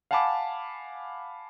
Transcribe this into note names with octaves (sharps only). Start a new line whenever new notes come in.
F5 F#5 G#5 A5 B5 D6